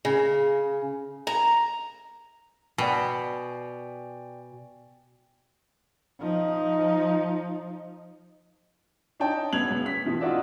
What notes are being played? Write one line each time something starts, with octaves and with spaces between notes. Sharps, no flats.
C#3
A#5
B2 D5 G5 G#5
F3 D#4
D4 D#4 C#5 D5 G5 A5
F#2 C#3 B3 G#6 F7 F#7
F#2 C#3 B3
B6
F2 B2 E3 F3
D#4 F4 F#4 D5 E5